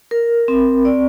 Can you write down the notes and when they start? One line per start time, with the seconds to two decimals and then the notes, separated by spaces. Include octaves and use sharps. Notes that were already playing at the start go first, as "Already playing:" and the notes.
0.11 A#4
0.48 C4
0.85 D5